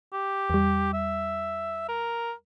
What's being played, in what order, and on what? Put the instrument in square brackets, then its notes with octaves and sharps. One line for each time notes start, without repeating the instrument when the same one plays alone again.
[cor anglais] G4
[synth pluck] E2 G3
[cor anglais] E5
A#4